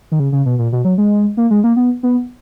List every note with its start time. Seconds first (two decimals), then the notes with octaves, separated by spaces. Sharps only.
0.11 D#3
0.20 C#3
0.32 C#3
0.46 B2
0.59 A#2
0.72 B2
0.85 F#3
0.98 G#3
1.37 A#3
1.51 G#3
1.64 A#3
1.76 B3
2.03 B3